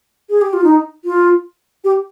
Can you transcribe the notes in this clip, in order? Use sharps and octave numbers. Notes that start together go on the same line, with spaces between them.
G#4
G4
F4
D#4
F4
G4